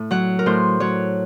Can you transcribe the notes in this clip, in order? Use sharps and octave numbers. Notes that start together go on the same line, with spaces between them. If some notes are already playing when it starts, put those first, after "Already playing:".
Already playing: A2
F#3 F#5
A#4
A2 C5
F#3 C#5